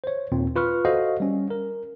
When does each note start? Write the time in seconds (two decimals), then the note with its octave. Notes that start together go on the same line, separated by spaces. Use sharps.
0.04 C5 C#5
0.32 D#2 A#2 C4
0.56 F4 B4 C#6 F6
0.85 F#4 A4 C5 D#5 F5
1.20 G3 C#4
1.50 A#4